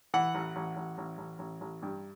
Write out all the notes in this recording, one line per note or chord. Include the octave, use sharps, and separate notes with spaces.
E3 F#5
A1
A1
A1
A1
A1
A1
A1
G2